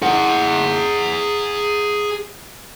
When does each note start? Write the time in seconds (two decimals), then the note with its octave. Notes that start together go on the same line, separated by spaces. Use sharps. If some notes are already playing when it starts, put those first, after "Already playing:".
0.02 G#4 F#5